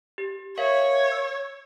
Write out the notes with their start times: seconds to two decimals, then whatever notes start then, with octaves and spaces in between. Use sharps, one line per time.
0.18 G4
0.58 A#4 C#5 E5 F5
1.12 E6